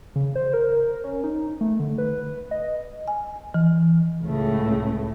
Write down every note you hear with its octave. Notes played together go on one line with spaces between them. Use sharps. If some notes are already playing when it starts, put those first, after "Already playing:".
C#3
C5
A#4
C#4
D#4
A3
D3
B4
D#5
G#5
E3
C#2 A2 C#3 A3